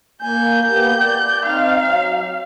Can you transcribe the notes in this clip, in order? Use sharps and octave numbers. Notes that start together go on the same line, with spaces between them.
A#3 G#5 G6
A#3 B3 G4
D5
C4 D#4 F5
F#3